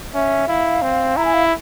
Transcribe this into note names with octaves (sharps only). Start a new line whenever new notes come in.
C#4 E5
E4 F5
C4
E4 A#5
G#5
F5